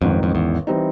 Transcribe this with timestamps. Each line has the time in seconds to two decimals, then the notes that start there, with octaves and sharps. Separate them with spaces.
0.02 A1 F2 G#2 D#3
0.23 F2
0.35 E2
0.67 E3 G3 C4 D#4